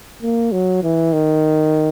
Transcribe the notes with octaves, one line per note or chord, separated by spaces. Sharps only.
A#3
F#3
E3
D#3